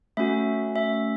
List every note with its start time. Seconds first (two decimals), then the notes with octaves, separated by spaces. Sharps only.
0.17 A3 C#4 F#4 E5
0.76 E5